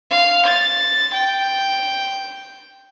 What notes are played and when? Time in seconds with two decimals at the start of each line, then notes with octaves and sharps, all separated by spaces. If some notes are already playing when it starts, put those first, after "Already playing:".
0.11 F5
0.46 A6
1.14 G5